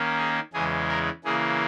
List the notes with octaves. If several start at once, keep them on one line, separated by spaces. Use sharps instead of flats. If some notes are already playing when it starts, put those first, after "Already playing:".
Already playing: D#3 A#3 C#4
G#4
E2 C#3 E3 G#3 G#4
A#4
C#3 E3 A#3 G#4